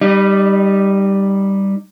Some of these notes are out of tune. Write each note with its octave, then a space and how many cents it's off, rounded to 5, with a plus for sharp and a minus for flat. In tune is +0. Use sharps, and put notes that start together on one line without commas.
G3 +0 D#4 -15 D5 +45